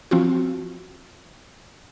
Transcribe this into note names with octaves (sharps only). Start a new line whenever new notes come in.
F3 C4 F4 F#4